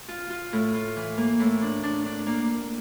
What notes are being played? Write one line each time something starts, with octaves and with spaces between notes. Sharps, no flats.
F4
F4
A2
F4
E3
A#3
A2
D4
D4
D4
A#3